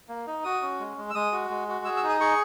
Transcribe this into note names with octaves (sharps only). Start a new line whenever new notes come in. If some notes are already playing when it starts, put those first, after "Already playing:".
A#3
D#4
F#4 D#6
C#4
G#3
G#3
E6
G#3 D#6
F#4
G#3
F#4
G#4 E6
E6
D#4
D#6
G#4 C#6